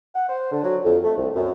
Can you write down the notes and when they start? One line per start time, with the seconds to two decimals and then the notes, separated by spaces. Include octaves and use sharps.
0.14 F#5
0.28 C5
0.51 D3
0.64 F#3
0.84 F2
1.03 A3
1.17 C2
1.35 F#2